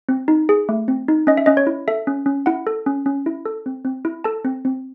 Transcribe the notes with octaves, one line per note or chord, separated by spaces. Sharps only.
C4
D#4
G#4
A3
C4
D#4
C#4 D#5
E5
C#4 D#5
C#5
E4
A4 E5
C#4
C#4
E4 F#5
A4
C#4
C#4
E4
A4
C4
C4
E4
A4 A5
C4
C4